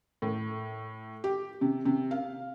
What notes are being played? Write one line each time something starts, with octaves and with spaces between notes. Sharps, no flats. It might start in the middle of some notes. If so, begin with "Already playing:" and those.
A2
G4
C3
C3
F5